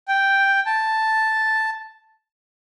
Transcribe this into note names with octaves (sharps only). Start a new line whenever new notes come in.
G5
A5